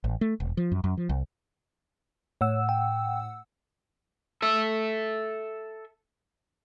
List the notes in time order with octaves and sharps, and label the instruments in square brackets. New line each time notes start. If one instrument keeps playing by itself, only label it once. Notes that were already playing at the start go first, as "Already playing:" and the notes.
[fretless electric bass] A1
A3
E1
F3
F#2
F#2
F3
C2
[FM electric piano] A2 F#5 E6 [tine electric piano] C#5
[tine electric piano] G5
[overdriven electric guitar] A4 E5